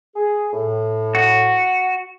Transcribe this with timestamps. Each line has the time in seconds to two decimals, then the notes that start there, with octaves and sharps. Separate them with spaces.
0.16 G#4
0.53 A2
1.15 F#4